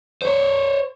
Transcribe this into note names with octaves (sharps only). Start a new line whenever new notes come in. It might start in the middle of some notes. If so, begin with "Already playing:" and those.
C5 C#5